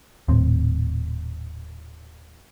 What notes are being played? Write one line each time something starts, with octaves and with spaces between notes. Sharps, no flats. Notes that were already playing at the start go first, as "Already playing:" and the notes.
D#1 A2 C4